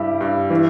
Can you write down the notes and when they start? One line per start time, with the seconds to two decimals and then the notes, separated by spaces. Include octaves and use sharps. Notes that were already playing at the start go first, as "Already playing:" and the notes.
Already playing: G2 G3 E4 G4
0.21 G2
0.50 E3